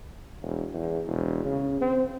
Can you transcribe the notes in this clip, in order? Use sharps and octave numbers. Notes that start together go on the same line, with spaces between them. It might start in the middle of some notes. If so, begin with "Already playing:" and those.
E1
E2
E1
C#3
C4